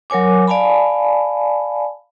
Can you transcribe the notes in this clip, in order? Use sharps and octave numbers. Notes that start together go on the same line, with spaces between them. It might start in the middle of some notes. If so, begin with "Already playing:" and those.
F#3 A#4 C#5 G#5 D6
D5 F5 G#5 A5 B5